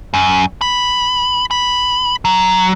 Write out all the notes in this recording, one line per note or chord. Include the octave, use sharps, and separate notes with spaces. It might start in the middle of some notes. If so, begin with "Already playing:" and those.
F#2
B5
B5
F#3